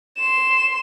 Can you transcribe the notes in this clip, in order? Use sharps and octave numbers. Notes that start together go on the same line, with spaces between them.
C6 E7